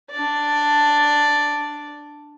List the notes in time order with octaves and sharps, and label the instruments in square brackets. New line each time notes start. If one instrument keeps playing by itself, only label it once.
[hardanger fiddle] D4 D5